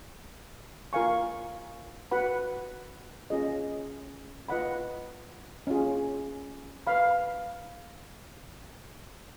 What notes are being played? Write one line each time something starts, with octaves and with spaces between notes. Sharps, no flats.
F4 A#4 F5 G#5 C#6
F#4 B4 F#5 B5
C#4 F4 G#4 D#5
F4 B4 D#5 F#5 B5
C#4 F4 G#4
B4 F5 B5